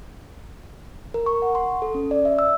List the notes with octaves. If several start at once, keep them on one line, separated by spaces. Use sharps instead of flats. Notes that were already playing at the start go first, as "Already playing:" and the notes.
A#4
C#6
F#5
C6
A4
C#4
D5
E5
E6